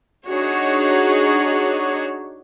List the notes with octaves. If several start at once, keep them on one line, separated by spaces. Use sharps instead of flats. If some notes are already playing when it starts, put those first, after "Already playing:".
D4 D#4 F#4 G#4 C#5